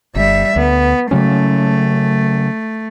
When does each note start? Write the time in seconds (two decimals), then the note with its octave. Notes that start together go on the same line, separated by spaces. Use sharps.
0.16 G1 G3 E5
0.56 D2 B3
1.11 C#3 F#3 A3 C#4